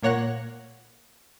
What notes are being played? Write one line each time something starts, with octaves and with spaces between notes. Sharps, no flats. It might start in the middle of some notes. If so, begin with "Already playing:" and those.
A#2 A#3 C#5 F#5 F#6 A#6